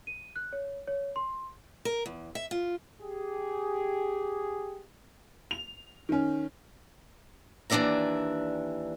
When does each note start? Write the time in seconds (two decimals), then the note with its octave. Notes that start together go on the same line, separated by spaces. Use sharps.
0.07 D#7
0.36 F#6
0.53 C#5
0.88 C#5
1.16 C6
1.85 A#4
2.06 E2
2.35 E5
2.51 F4
3.01 G4 G#4
5.51 F7
6.09 D#3 C#4
7.70 D#2 E3 D4 D5 E5 A#5